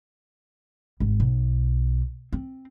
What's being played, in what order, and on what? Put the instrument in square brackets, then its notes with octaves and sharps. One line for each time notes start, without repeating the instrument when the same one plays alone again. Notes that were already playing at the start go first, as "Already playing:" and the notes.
[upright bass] G#1
B1
C4